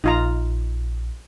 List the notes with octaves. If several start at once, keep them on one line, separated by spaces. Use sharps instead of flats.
A#1 D#4 F4 A#5